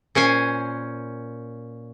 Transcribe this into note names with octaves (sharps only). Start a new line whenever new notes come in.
A#2 C#4 C5 G#5